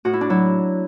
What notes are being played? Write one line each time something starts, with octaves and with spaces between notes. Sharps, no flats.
A2 F#4
E4
D4
F#3 E4